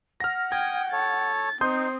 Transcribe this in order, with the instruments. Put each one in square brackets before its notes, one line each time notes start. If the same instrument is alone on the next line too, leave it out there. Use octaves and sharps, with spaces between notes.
[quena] F#5 [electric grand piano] F6 A#6
[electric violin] G5 [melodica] D#6 [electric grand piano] G#6
[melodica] A4 C#5 [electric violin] A6
[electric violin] C4 [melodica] D#4 [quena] C5 [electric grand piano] C6 D#6 G6